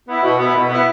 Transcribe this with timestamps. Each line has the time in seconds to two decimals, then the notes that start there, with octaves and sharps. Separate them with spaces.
0.08 B3 E4
0.23 B2
0.39 B3 E4
0.55 B2
0.69 B3 E4